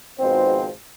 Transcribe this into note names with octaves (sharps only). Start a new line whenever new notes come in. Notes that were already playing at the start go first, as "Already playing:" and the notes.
G#1 G#2 B2 F3 C4 C5